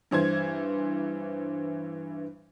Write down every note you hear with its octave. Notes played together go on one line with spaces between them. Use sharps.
G2 E3 C5 G#6